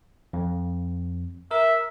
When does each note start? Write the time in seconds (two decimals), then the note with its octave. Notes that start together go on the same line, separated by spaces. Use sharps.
0.33 F2
1.51 A#4 E5